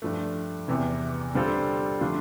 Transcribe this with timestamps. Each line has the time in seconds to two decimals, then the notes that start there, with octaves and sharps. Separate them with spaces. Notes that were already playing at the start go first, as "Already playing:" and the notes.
0.02 G2 F3 A3
0.68 E2 C3 E3
1.34 D3 G3 C4 F4 A4
2.01 D3 F3 A3 D4 F4